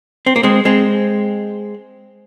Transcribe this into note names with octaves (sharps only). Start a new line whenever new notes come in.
C4
A#3
G#3 C4
G#3 C4